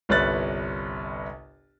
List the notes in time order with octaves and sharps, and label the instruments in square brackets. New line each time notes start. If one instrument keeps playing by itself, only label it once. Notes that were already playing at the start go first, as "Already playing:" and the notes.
[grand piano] G1 C2 B4 C#5 F#6 A6